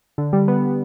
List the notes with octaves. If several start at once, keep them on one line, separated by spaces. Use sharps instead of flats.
D3
G3
B3